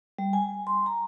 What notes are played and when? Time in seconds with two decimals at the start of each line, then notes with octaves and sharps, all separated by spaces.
0.19 G3
0.33 G#5
0.67 C6
0.86 A#5